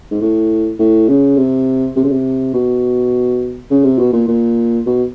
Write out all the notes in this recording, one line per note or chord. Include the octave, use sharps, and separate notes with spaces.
G#2
A2
A2
C#3
C3
C3
C#3
C3
B2
C#3
C3
B2
A#2
A#2
B2